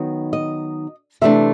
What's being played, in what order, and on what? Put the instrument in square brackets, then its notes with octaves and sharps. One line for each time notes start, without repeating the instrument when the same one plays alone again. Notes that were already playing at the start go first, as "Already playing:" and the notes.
Already playing: [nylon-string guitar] D#3 F#3 B3 D#4
D#5
C3 E3 A3 D4 E5